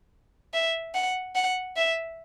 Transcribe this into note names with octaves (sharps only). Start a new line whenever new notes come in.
E5
F#5
F#5
E5